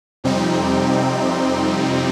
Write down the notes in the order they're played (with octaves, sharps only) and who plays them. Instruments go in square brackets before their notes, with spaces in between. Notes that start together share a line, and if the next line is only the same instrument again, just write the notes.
[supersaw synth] F2 C3 G3 C4 D#4